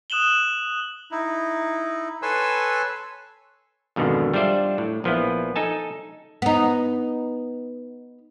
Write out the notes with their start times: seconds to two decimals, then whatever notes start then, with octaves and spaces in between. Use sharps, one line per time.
0.10 D#6 F#6 E7 F#7 G7
1.11 D#4 E4
2.22 A4 B4 C#5 G#5 C6 E6
3.96 F2 G#2 B2 D3 D#3
4.34 G3 D4 F4 C5 D5 E5
4.78 A2
5.04 A#1 F3 B3 E4
5.56 D#4 A4 G#5 A5
6.42 B3 D#4